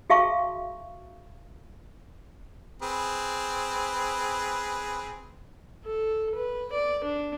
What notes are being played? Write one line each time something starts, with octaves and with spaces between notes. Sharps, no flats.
F#4 G#4 E5 F5 A5 C#6
C4 G#4 B4
A4
B4
D5
D4